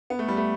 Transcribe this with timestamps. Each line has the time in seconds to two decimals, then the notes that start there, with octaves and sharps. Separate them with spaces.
0.10 B3
0.19 A3
0.28 G3
0.37 A3